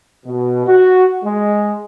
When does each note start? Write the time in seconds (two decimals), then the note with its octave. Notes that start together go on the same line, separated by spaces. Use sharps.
0.25 B2
0.66 F#4
1.23 G#3